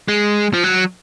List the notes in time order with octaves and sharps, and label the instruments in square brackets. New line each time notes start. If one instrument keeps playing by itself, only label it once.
[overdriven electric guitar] G#3
F3
F#3